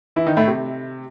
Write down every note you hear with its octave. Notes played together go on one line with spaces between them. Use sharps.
E3 E4
D#3 D#4
A2 A3
C3